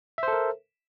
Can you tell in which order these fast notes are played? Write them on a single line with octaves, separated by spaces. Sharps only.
E5 C5 A4 A#4